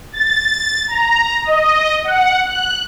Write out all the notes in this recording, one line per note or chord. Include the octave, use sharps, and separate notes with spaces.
A6
A#5
D#5
F#5
F#6